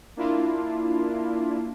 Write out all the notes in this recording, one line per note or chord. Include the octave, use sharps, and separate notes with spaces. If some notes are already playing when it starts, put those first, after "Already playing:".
A#3 D4 E4 F4